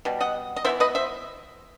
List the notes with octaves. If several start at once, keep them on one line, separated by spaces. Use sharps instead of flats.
B2 G3
D#5 F#5
D#5
E3 B3 E4 C5 E5
B4 D#5
C5 E5